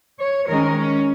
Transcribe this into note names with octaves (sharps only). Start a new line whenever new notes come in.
C#5
D#3 G#3 C#4 A#4
C#4